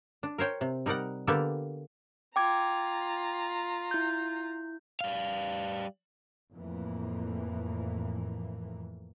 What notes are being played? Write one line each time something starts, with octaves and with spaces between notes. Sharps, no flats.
D4
A#4 C5 C#5 G5
C3
G3 D#4 A#4 D5 F#5
D3 A#3 B3 G4 A4
F4 G5 A#5 D6 G#6
E4 G6
G3 F5
F2 A2 E3 A#3